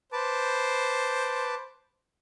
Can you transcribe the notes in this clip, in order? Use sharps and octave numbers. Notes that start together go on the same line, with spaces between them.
B4 C5 A5 D6